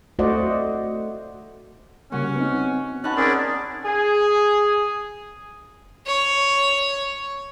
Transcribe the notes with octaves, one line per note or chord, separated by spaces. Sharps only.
A3 F#4 C5 D5 D#5 F#5
C#3 G3 A#3 C#4 F#4
B3 C4 D#4
B3 C#4 D#4 A5 F#6
C4 C#4 G#4 A#4 D5
G#4
C#5